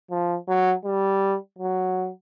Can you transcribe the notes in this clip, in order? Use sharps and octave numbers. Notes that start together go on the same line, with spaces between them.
F3
F#3
G3
F#3